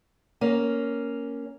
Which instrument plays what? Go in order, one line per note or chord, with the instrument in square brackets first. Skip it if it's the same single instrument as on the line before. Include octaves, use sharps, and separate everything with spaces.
[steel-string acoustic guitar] A#3 C#4